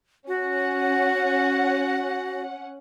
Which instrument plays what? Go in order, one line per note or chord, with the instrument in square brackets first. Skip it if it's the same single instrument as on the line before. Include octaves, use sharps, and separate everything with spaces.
[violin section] C#4 F#5 [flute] F#4